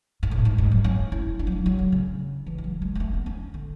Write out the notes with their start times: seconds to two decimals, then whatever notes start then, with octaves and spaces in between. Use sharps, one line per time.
0.23 G#2
0.31 A2
0.45 G#2
0.58 G#2
0.72 F#3
0.84 C#4
1.12 E4
1.39 D4
1.47 F#3
1.52 G#3
1.66 F#3
1.79 D3
1.92 C#3
2.46 E3
2.58 G#3
2.64 F#3
2.82 G#3
2.95 G#3
3.00 A3
3.13 B3
3.26 C#4
3.54 D3